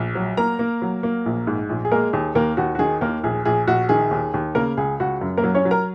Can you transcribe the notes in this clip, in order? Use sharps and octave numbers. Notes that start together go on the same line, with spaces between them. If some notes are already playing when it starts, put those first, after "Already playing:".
Already playing: A#1
F#3
A#3 A#4 A#5
A#3
F#3
A#3
A#1
G#2
A#1
G#4
G#3 A#3 A#4
D#2 G#4
D#2 A#3 A#4
D#2 F#4
F#4
D#3 G#4
D#2 A#3 A#4
A#1 G#4
A#1 G#4
A#1 F#4
D#3 G#4
D#2
D#2
C#3 A#3 A#4
C#2 G#4
C#2 F#4
F#2
A#3 A#4
F#3
C#4 C#5
F#3
A#4 A#5